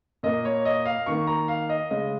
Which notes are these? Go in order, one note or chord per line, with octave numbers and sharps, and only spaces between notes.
A#2 A#3 D#5
C#5
D#5
F5
D#3 A#3 C#6
A#5
F5
D#5
C#3 G#3 D#5